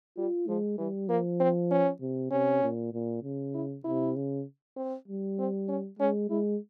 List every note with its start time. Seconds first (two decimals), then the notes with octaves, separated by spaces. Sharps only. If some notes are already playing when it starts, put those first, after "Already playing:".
0.17 G3 F4
0.47 F3 G#3
0.78 E3 G3
1.09 F3 A#3
1.40 C4
1.71 C#4
2.01 C3
2.31 C3 C#4
2.63 A#2
2.94 A#2
3.23 C#3
3.54 E4
3.84 C3 E4
4.16 C#3
4.77 C4
5.08 G3
5.39 C4
5.69 C#4
5.99 G#3 C#4
6.30 G#3 E4